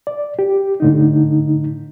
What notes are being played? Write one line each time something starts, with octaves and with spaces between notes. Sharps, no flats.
D5
G4
A2 D3 D#4